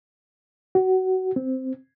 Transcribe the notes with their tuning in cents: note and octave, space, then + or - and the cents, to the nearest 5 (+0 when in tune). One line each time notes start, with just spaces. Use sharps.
F#4 +20
C4 -5